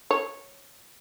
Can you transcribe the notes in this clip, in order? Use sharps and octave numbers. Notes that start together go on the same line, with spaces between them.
C#5